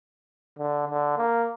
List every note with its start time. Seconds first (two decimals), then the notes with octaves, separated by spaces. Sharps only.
0.59 D3
0.88 D3
1.18 A#3